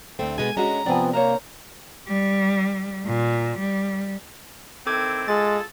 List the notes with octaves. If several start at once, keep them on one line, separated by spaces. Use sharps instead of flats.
D2 A3 C4
B2 G#3 B3 G#5
G#3 C#4 D4 F#4 D#5 A#5
C3 F3 B3 C4 D4 D5 G#5
A#3 A#4 C5 C#5 A#5
G3
A#2
G3
D#3 C4 E4 A4 D6 G#6
G#3 F4 G#4 A4 A6